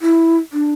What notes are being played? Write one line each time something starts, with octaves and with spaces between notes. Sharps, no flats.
E4
D4